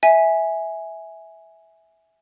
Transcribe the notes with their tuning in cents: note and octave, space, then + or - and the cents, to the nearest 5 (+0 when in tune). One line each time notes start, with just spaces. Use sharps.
E5 -15 G#5 +0